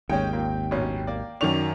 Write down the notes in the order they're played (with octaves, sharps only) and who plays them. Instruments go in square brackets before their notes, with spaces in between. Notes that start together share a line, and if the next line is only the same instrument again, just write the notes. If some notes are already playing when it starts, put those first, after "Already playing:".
[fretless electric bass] G#1 D#2 [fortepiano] G#3 C#4 [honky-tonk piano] G5
[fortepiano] A#2 A#3
A#1 B2 C#4
A#3 D5
[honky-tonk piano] F#2 D#3 F7 [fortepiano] D5 C#6